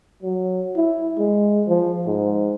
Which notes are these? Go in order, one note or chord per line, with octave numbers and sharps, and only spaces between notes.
F#3
E4
G#3
F3
G#2